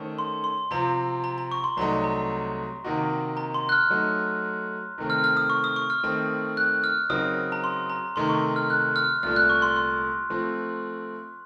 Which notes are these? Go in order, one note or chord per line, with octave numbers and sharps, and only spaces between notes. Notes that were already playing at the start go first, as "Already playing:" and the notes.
Already playing: D#3 A3 C#4 A4 C5
C6
C6
C3 F3 C4 F4 A#5
A#5
A#5
C#6
C6
C2 C3 F#3 A3 D#4 A#5
A#5
C3 D#3 A#3 D#4 F#4
A#5
C6
F#6
F6
F#3 A3 D#4
C3 D#3 A3 C4
F6
F6
D#6
C#6
D#6
C#6
F6
D#3 A3 C4
F#6
F6
C#3 F#3 C4 D#4 A#4 D#6
A#5
C6
A#5
C3 D#3 A3 D#4 C6
C#6
F6
F#6
F6
C2 A#2 A3 F6
F#6
C#6
C6
C6
F3 A3 C4